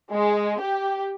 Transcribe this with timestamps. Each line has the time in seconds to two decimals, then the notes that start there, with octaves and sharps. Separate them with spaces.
0.11 G#3
0.60 G4